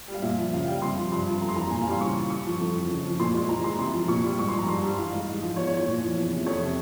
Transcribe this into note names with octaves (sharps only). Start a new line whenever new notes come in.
G3
F5
A#2 E5
F3
C#3 F5
G3 G5
C3 C6
F3
G2 C6
F3
F2 A#5
C6
E3 A#5
A#2 G#5
F5
G3
C6
C#3 C#6
E3
G2 C#6
F3
F2
E3
C#3
F3
A#2 C6
G#3
E3 A#5
G#3 C6
C3 C6
F3
A#2 C#6
G3
G#2 C#6
F3 C6
A#5
G2 C6
G3
E3 F5
G#3
G#2
F3
E2 C#5
C#5
E3
C#5
A#2
F3
E2
C3
F2 C#5
C3